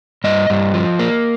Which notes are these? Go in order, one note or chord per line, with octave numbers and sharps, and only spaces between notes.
G2 D#5
G2
F3
A#3